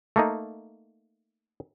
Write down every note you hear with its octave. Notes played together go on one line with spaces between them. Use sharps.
A3 A#3 D#4